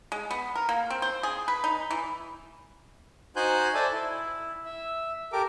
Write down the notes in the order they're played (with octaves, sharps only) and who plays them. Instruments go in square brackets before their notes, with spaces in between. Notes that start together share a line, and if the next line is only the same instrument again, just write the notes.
[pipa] G#3
B3
A#4
A#3
C4
C5
G#4
B4
D#4
E3
[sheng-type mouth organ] D#4 F#4 C5 G#5 F#6 G6
A4 C5 D5 E5 G#5 A5
E4
E5
G4 A4 A#4 D6